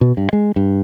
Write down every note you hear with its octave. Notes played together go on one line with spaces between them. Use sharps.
B2
G2
G#3
G2